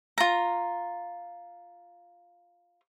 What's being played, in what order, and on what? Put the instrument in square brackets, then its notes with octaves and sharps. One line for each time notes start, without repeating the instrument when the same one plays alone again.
[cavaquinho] F4 A#5